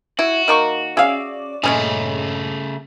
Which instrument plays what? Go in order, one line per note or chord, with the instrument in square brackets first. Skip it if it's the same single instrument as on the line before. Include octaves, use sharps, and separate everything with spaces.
[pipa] E4 [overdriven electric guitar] F#4
[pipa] D#3 A#3 C#6
[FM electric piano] C#4 D5 D6 [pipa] G#4 [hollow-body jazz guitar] E5 F5
[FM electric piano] G2 A#2 [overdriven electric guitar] C#3 A3 [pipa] G#3 C#4 G#4